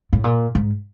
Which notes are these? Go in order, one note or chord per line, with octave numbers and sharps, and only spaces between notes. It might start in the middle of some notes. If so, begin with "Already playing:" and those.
A2
A#2
G#2